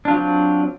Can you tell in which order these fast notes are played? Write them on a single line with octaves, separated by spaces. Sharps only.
D4 F4 F#3 C4